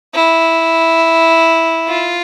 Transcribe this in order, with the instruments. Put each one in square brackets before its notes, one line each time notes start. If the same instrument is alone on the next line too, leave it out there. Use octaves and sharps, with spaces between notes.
[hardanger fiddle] E4
F4